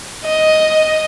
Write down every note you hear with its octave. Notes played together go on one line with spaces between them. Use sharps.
D#5